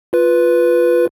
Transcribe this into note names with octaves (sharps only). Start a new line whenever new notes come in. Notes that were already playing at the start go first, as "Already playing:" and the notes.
F4 B4